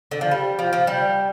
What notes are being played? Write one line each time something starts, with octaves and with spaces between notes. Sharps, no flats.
D3
F3
G3
F3
F3
G3